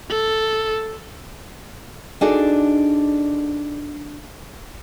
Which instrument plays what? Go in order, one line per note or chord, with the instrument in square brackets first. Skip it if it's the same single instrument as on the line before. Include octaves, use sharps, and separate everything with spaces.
[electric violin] A4
[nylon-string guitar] D4 D#4 F#4 G#4 A4 D5